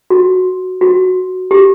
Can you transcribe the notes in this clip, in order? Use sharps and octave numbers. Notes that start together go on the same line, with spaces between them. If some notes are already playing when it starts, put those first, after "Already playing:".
F#4
F#4
G4